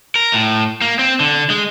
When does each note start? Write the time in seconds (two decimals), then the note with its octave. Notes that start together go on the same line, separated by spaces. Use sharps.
0.15 A#4
0.33 A2
0.81 A#3
0.99 C4
1.20 D3
1.50 G#3